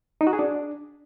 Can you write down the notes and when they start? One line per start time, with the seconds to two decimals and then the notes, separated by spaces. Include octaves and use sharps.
0.21 D#4
0.27 F#4
0.33 G#4
0.39 D4